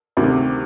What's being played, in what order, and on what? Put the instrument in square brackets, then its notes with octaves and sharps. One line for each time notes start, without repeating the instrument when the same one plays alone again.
[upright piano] D2 C3 D#3